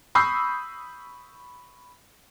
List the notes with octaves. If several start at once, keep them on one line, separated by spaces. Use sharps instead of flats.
B5 C#6 D#6 E6 G6 C7